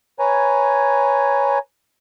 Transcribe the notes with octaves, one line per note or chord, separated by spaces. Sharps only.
B4 C#5 G#5 A#5